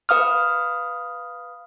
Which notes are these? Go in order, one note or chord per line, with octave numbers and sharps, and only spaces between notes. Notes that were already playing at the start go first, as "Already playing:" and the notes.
B4 F5 D#6 F6